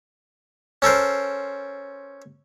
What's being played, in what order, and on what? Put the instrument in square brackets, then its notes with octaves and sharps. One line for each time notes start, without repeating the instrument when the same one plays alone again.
[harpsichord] C#4 A4 A#4 C5